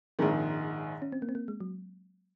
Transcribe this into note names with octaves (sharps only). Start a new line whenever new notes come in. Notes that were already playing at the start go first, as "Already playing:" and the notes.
A#1 G#2 D#3 C4
C#4
C4
A#3
C4
A#3
G#3
F#3